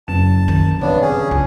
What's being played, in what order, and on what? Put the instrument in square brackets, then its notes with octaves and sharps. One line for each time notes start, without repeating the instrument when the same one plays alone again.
[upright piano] F#1 E7 [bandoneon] A5
[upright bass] D#3
[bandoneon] G2 B3 D4 [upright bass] C3 [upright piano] C#5
[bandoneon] C#4 G#4
[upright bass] C#2